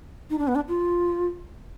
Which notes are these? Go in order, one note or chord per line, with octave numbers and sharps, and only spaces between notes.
D#4
D4
B3
D4
F4